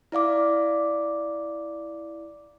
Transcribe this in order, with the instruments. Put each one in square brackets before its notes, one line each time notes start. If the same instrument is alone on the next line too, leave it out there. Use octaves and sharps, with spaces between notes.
[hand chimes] E4 D5 F5 D6